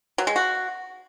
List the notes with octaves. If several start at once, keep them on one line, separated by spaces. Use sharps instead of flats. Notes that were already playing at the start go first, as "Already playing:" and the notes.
F#3
G#3
F#4